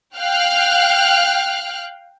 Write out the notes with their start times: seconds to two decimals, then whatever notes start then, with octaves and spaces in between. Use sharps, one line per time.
0.17 F5 G5 F6 F#6